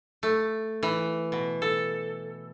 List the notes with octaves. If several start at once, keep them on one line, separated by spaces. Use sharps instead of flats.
A3
E3
B2
A4